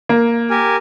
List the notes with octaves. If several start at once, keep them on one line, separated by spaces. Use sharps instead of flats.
A#3
G4 A#4 G#5